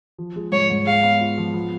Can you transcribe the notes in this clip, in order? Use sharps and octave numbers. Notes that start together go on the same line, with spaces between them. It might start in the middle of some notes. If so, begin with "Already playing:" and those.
F3
G#3
G#2 C#5
G#2
G#3 F5
B3
F4
F3
B3